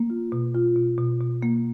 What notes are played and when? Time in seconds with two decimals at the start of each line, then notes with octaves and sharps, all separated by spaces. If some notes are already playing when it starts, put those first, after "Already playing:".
Already playing: A#3
0.10 F4
0.32 B2
0.55 F4
0.76 B2
0.98 B2
1.21 B2
1.43 A#3